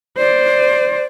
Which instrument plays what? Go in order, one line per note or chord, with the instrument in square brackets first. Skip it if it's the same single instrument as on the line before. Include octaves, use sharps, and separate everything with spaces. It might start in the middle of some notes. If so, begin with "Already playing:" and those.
[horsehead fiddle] C5 [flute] D5